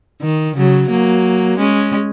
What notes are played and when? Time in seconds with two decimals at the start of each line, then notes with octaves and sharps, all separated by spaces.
0.22 D#3
0.56 C#3 F#3
0.90 F#3 A#3
1.58 G#3 C#4